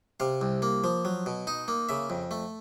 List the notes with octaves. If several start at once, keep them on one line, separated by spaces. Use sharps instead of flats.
C3 F5
C2
A#3
F3
F#3
B2
D#4
A#3
C#3 E5
F2
A3